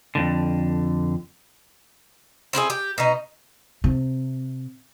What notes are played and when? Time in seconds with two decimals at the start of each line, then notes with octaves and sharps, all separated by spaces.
0.15 F2 G#2 D3
2.53 C4 E4 F#4 G#4
2.70 G4
2.98 B2 D#4
3.84 C3